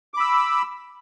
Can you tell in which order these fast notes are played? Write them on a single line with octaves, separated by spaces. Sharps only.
D6 B5 E6